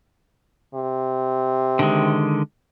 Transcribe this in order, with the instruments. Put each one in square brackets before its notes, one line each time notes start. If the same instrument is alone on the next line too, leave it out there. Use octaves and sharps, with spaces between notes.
[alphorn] C3
[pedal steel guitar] D3 D#3 G#3